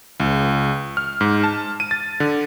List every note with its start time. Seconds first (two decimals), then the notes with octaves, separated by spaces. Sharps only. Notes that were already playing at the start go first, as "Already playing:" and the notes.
0.20 C#2
0.97 F6
1.21 G#2
1.43 A5
1.80 D#7
1.91 A6
2.20 D3